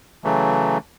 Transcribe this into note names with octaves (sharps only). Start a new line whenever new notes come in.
C#3 E3 F#3 A3